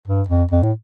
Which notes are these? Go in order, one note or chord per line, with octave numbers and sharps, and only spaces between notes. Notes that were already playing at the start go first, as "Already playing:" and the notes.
G2
F2
F2
A2